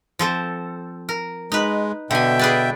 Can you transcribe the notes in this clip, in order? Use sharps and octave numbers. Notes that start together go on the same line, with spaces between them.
F3 C4 A4
A#4
G#3 D#4 B4
B2 D3 E5 G5 G#5
G#4 B4 D5